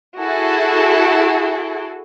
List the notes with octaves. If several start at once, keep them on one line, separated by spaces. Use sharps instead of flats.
E4 F#4 G#4 A4